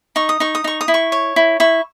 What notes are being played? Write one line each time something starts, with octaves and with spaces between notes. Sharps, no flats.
D#4 C#6
D#6
D#4 C#6
D#6
D#4 C#6
D#6
E4
C#6
C#5
E4
E4 C#6